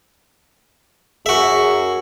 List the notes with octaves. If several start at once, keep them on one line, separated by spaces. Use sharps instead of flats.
F#2 F#4 G#4 E5